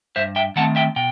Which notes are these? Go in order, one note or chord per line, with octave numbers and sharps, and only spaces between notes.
G2 C5 E5
E5 G5
D#3 A3 C4 F#5 A5
E5 G5
B2 G5